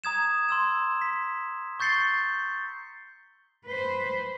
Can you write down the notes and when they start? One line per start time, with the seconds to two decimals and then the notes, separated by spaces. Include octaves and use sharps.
0.04 A#5 D#6 G#6 E7
0.49 C6 E6 E7
1.02 B6
1.80 C#6 G6 A6 C7 C#7 G7
3.66 B4 C5